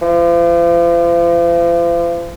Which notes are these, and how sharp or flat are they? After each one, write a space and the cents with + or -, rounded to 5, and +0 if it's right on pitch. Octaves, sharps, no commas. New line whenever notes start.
F3 -40